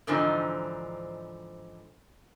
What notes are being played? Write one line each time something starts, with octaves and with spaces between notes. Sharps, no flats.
G#2 D3 E3 F3 C4 D#4